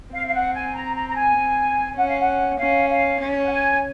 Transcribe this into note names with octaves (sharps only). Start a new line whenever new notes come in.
C4 F5
F5
F#5
G#5
A#5
A#5
A#5
G#5
C4
C#4 F#5
F5
F#5
C#4 F5
F5
C#4
F#5
G#5